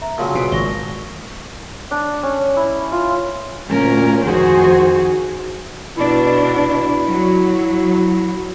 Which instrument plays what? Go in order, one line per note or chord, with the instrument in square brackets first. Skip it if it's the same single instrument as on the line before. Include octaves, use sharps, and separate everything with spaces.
[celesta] E5 A#5
[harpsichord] A#2 C#3 F#3 [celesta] A5 C6
[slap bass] B2
[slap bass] G#1 [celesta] C#6 A#6 G7
[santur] D4
C#4
E4
F4
[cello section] D2 A#2 C#4 A#4
F2 D#3 F#4 G#4 C5
[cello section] B2 D4 [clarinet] E4
[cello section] F#3